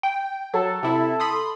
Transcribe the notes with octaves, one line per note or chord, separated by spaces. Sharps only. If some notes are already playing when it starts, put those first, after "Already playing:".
G5
F#3 A4
C3 E4
B5 C6 D#6